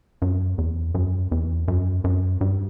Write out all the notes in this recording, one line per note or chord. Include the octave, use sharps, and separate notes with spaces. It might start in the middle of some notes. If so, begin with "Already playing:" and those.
F#2
E2
F#2
E2
F#2
F#2
G2